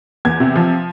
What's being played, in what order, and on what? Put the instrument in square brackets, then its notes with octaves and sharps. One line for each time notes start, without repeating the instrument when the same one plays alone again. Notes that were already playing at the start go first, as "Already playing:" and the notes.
[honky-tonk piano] E2 G#6
C3
F3